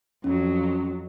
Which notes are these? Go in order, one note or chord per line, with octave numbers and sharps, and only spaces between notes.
F2 F#3 C#4